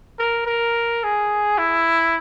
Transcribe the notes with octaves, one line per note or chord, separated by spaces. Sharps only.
A#4
A#4
G#4
E4